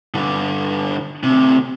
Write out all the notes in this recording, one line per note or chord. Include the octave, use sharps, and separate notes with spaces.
G2 D3
D2 C3